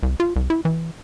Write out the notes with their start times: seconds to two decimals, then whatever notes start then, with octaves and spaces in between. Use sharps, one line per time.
0.03 C2
0.20 F4
0.36 C2
0.50 E4
0.65 E3